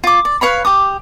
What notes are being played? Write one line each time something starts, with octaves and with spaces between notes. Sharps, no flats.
F4 D6
D5
B4 C#5 F5 B5
G4 D6 D#6